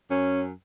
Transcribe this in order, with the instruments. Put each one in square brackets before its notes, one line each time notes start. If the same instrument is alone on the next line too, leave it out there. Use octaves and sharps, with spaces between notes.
[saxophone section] F#2 C#4